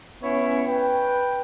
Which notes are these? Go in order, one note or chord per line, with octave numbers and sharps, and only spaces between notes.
B3 C#4 E4 C#5
B4 G5